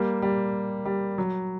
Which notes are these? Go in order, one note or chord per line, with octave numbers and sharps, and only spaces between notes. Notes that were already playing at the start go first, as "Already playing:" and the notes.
Already playing: G3 A#3
G3
G3
F#3